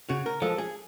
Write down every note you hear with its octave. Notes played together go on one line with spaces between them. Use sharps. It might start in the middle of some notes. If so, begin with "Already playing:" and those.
C#3 F#4
A#4
F3 G#3 A4
G#4